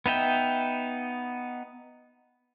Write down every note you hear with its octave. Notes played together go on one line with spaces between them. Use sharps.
B3 D#4 E5 G5